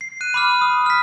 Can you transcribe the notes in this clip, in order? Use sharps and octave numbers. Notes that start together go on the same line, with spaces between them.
C7
F#6 D#7
B5 D6 F6
D#6
F6 B6